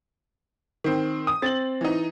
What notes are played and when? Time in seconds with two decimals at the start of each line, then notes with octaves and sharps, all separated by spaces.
0.84 D#3 C4
1.27 D#6
1.42 C4 A6 F#7
1.81 E3 D#4